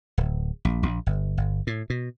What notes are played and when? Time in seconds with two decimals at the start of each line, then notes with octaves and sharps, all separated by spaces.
0.18 D1
0.65 A#1
0.83 A#1
1.06 G1
1.37 G1
1.67 A2
1.90 B2